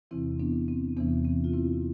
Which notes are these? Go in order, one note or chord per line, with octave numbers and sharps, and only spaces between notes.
E2 C3 E3 C4 E4
B3 D4
C4
E2 C3 E3 B3 D4
C4
F4
C4 E4